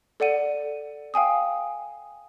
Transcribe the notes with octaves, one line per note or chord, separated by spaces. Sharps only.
A4 D5 F#5 D#7
F5 G5 G#5 D#6